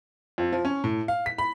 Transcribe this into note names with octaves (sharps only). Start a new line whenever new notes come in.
F2
F3
C#4
A2
F5
B6
B5